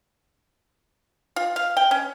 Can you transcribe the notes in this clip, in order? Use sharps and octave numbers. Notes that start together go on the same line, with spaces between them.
F4
F5
G5
C#4